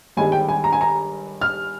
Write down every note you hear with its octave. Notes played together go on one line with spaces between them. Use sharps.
G1 G2 D#3 G#3 G#5
G5
G#5
A#5
G#5
A#5
F6